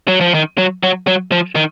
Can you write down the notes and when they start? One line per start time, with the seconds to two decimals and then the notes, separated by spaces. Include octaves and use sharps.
0.08 F#3
0.21 F3
0.34 D#3
0.58 F#3
0.83 F#3
1.07 F#3
1.32 F3
1.55 D#3